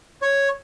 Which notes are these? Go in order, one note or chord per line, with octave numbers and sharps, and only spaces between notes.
C#5